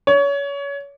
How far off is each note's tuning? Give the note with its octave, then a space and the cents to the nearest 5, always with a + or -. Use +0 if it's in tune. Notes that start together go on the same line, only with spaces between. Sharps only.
C#5 +25